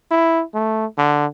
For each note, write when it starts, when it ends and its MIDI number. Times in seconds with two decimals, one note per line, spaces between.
0.11 0.42 64
0.54 0.85 57
0.98 1.26 50